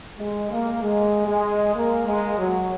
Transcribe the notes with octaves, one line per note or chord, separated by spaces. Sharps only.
G#3
A#3
G#3
G#3
A#3
G#3
F#3